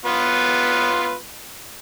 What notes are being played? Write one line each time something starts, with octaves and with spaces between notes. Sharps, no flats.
B3 F4 B4